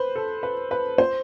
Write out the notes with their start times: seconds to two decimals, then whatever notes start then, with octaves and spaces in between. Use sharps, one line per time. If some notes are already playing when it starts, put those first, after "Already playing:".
Already playing: B4 C5
0.16 A4
0.43 B4
0.71 B4
0.98 C5